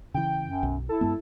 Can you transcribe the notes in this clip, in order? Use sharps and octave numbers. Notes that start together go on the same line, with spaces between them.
C#3 E3 G5
F#2
B1
E4 A4
G2 G#3 B3